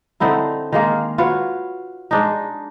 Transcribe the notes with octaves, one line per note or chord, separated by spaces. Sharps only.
D3 C4 D#4 E4
D#3 G#3 A#3
F4 F#4 B4 C#5
G#3 D4 D#4